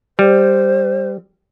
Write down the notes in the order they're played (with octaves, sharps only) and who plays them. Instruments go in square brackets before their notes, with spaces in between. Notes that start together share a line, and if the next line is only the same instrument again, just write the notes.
[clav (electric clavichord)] G3 [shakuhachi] C5